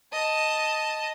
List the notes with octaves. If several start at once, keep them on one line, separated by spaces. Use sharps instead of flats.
D#5 A5